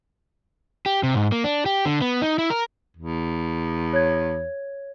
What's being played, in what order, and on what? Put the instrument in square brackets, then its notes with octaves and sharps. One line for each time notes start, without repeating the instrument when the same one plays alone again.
[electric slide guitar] G4
C3
G#2
A#3
D4
G4
D3
B3
D#4
E4
A#4
[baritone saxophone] E2
[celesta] C#5 G#6